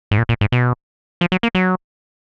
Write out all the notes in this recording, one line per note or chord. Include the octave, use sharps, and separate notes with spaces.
G#2
A#2
A#2
G#2
B2
F3
F#3
A#3
F#3